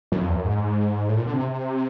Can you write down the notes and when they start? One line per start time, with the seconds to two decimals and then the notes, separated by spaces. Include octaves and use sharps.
0.12 F#2
0.20 F2
0.28 E2
0.35 F#2
0.44 G#2
1.09 A2
1.17 A#2
1.26 D3
1.33 C3